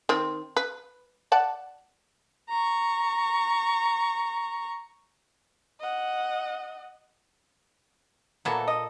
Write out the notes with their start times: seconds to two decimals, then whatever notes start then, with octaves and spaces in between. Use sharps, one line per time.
0.09 D#3 C4
0.57 B4
1.32 D5 F#5 A5
2.49 A#5 C#6
5.79 D#5 F#5
8.45 A#2 E3 F#3 B3 A4
8.68 D#5